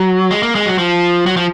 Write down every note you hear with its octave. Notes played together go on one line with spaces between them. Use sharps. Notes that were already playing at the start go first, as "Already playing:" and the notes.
Already playing: F#3
G#3
A#3
G#3
F#3
F3
F#3
F3